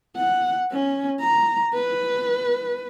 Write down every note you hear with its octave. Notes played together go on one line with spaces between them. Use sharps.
F#5
C#4
A#5
B4